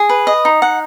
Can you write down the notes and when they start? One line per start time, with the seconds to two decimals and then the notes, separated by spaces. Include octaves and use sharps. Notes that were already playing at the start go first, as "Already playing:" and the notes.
Already playing: G#4
0.09 B4
0.27 D#5
0.45 D#4
0.62 F#5